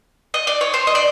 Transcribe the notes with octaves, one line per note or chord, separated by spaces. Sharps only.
D#5
D5
C#5
C5
D#5
D5